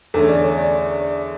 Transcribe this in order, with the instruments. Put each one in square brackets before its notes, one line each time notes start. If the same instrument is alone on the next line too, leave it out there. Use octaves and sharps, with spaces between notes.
[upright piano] E2 D3 A3 C#4 [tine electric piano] A4
[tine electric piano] D5
C#5
D5